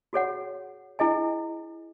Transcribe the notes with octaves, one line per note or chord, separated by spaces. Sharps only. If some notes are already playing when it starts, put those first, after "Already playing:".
F#4 G#4 C#5 F#5
E4 G#4 D#5 G#5